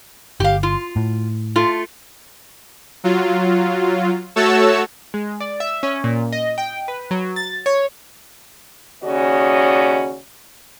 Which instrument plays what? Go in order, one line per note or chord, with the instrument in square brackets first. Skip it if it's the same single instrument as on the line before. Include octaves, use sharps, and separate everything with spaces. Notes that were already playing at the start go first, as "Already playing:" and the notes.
[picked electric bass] G1 [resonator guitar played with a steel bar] G4 F5
[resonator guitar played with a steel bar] F4
[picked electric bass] A2
[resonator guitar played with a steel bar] A3 F4
[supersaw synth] F#3 F4
A3 F#4 A4 C#5 A5 E6
[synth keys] G#3
D5
E5
C#4
A#2
D#5
G5
B4
F#3
A6
C#5
[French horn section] D#2 C#3 C#4 F#4 D5 D#5